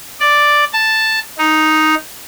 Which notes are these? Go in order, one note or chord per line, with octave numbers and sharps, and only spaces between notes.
D5
A5
D#4